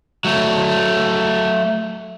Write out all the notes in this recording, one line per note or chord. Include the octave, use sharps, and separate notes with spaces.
F#3 A3